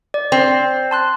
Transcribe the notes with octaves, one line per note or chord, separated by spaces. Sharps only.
D5
C4
A5 C6 F#6